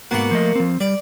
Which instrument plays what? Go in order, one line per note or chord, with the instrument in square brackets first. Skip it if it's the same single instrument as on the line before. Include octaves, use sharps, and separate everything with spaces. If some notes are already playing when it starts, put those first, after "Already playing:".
[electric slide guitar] G#2 B3 F#4 [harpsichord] A#3 F#5
[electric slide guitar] F3 A3 D#5
F3 C4
[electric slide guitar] G3 [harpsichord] D5